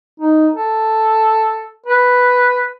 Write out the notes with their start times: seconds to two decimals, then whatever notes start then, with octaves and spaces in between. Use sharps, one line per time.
0.20 D#4
0.56 A4
1.86 B4